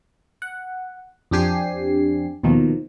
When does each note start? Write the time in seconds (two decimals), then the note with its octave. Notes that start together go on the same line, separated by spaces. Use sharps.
0.42 F#5
1.31 F2 C4 D4 G4 G#5 C7
2.43 D#2 B2 D#3 F3